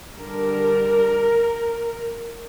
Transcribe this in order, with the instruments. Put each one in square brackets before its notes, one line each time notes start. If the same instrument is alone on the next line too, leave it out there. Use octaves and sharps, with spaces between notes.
[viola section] D3 G3 D4 A#4